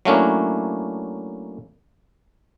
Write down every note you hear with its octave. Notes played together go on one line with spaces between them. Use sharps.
F#3 A3 A#3 C#4 D4 E4